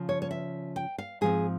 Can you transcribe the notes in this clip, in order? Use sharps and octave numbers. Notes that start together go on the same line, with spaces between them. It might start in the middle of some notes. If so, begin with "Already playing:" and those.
Already playing: C#3 F3
C#5
C#5
E5
G5
F5
G#2 F3 C4 G#4